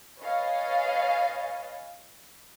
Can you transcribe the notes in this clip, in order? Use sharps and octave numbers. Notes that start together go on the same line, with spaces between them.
B4 C#5 D#5 F5 G#5 A6